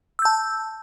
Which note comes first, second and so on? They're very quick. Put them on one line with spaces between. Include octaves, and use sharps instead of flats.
E6 G6 A5